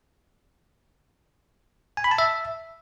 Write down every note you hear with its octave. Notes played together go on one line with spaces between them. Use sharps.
G#5
B5
A5
E5